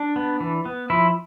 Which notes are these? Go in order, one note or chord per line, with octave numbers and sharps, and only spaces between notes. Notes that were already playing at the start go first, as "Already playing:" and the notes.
Already playing: D4
B3
E3
B3
F3 E4